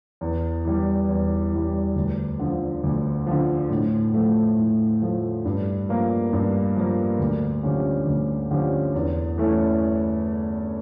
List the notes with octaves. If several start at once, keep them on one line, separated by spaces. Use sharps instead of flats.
E2
E3 G3
E2
E3 G3
D2
D3 F3
D2
D3 F3
A2
F3 A3
A2
F3 A3
G2
F3 A#3
G2
F3 A#3
D2
D3 F3 C#4 G4
D2
D3 F3 C#4 G4
E2
E3 A3 C#4 E4